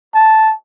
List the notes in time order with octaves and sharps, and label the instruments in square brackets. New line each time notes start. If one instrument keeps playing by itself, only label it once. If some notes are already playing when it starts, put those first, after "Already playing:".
[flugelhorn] A5